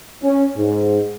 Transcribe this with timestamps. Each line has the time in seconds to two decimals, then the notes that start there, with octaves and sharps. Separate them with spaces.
0.23 C#4
0.56 G#2